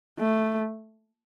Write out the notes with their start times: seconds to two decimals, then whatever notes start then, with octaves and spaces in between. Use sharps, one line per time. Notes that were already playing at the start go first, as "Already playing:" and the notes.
0.19 A3